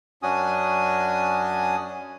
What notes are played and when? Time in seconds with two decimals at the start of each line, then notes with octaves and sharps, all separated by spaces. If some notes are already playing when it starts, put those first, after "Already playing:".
0.23 F#2 C#4 D4 F#4 G#5 D#6